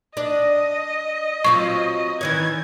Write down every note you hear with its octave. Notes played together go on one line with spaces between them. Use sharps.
D4 D#5
F#3 C4 F4 C#6
D#3 E3 C#5 G#6